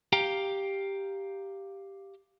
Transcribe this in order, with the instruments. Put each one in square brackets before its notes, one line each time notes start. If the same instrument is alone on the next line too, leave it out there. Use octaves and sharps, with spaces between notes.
[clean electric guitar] G4 F5 G5 A#5